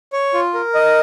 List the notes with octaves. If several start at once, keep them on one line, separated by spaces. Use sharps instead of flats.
C#5
F4
A#4
D#5